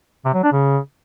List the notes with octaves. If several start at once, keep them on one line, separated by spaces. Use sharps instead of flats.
C3
F#3
D4
C#3